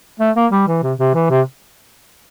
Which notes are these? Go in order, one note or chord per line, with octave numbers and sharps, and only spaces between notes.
A3
A#3
G3
E3
C3
C3
E3
C3